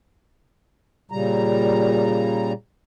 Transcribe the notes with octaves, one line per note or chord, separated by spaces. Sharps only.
A#2 C#3 G3 A#5